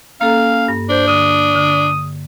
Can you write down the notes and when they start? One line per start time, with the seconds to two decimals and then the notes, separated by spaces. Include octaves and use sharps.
0.21 A#3 C#4 A4 F5 A#5
0.68 G2
0.89 D4 C5
1.08 D3 D#6
1.55 D3